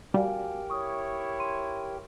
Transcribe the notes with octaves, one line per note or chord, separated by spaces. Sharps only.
G3 F#4 G4 A#4 F5 G5 G#5
E4 C#5 C#6 D#6
C6 D#7